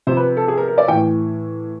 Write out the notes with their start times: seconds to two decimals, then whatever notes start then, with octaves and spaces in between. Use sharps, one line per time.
0.07 C3 F3 C5
0.17 B4
0.37 A4
0.48 G#4
0.57 A#4
0.68 A#4
0.78 D5
0.88 A2 E3 G5